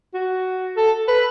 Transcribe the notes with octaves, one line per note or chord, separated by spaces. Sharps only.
F#4
A4
B4